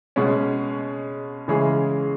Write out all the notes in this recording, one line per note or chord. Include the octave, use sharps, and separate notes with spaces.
B2 G#3 C#4
C#3 E3 G#3 C#4 G#4